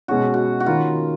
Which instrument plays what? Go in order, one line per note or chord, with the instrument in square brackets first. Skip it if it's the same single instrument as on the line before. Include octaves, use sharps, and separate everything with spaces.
[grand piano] B2 G#3 C#4 [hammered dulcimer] F#4
[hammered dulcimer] F#4
F#4
[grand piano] D#3 A#3 C#4 [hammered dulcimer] F4